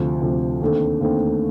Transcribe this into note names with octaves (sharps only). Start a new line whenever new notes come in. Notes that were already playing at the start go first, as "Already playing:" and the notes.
Already playing: D2 C3 F3
D2 C3 F3
D#2 D3 A3 C4
D#2 D3 A3 C4